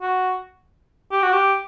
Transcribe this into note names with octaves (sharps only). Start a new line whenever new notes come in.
F#4
G4
F#4
G4